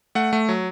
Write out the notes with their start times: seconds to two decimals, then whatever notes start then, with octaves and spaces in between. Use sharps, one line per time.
0.15 A3 F#5
0.33 A3
0.49 F#3